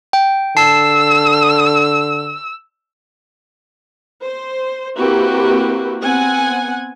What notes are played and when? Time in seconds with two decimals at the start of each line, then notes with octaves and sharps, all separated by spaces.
0.13 G5
0.57 D3 A5 E6 C7
4.25 C5
4.98 A#3 C4 E4 F#4 G4 B4
6.02 B3 C4 F#5 G#5